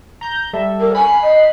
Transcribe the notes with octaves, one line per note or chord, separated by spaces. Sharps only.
A#5 G6
G3 A4 E5
A#4
G#5 B5 F#6 C7
D#5